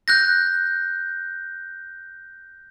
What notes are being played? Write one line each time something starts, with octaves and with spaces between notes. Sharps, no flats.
F#6 G6 A#6